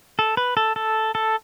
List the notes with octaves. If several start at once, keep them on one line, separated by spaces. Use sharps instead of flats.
A4
B4
A4
A4
A4